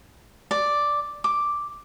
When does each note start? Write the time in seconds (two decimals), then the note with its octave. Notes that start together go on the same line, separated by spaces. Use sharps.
0.51 D5
1.24 D6